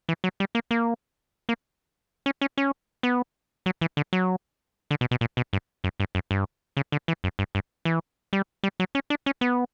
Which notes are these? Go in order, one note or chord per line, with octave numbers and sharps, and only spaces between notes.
E3
F#3
G3
A#3
A#3
A#3
C#4
C#4
C#4
B3
F#3
E3
D3
F#3
D3
B2
B2
A#2
B2
G2
F#2
G2
F#2
G2
C#3
D3
E3
F#2
G2
G2
E3
G3
G3
F#3
C#4
D4
C#4
B3